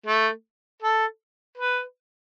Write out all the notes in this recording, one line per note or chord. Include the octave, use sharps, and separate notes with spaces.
A3
A4
B4